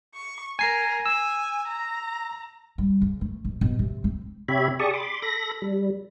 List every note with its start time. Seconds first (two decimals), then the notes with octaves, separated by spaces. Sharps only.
0.15 C#6
0.59 A#4 G#5 C7
1.06 G#5 E6
1.67 A#5
2.78 G3
3.01 C#3
3.21 A3
3.45 B2
3.61 B2
3.79 C3
4.04 C4
4.48 C3 G4 C#5 E5 B5
4.79 G4 G#4 D5 A5 C#6 D#6
4.94 B5 C6 D6
5.22 A4 B5 A#6
5.62 G3